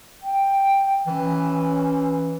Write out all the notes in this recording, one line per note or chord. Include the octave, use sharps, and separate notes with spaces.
G5
E3 C#4